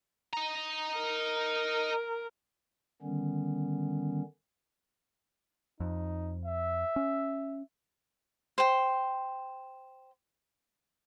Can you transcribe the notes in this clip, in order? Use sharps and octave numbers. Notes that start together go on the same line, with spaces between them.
D#5 A#5
A#4
D3 D#3 G3 B3 C#4
F2 D#4
E5
C#4
C5 G5